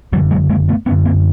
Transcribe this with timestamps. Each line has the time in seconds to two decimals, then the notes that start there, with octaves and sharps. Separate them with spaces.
0.13 F#1 F#2 D3 F3 G3
0.31 F#3 G#3
0.49 G#3 A#3
0.69 A3 B3
0.86 F#1 B3 C#4
0.90 F#2 D3
1.05 A#3 C4